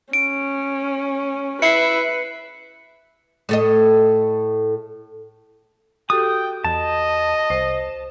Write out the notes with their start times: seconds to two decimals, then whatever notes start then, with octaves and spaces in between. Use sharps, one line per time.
0.13 C#4 D7
1.62 E4 B4 C7 C#7
3.49 A2 A4 D#5
6.10 F#4 G4 A4 G5 D#6
6.64 E2 D#5 A5
7.50 C2 C5